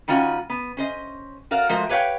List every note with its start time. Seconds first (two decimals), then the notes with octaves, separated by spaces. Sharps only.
0.08 D#3 G3 C#4 F4 F#4
0.50 B3
0.77 C#4 C5 D#5
1.51 F#4 A#4 D5 F5
1.69 F3 G#3 A3 F#4 A#4 C5
1.89 G4 B4 C#5 E5 F5 G5